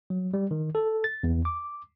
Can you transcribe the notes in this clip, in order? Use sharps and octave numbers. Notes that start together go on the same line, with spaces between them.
F#3
G3
D#3
A4
A6
E2
D6